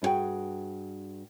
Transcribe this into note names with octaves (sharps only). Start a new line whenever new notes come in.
G2 E4 F#4 G#4 G5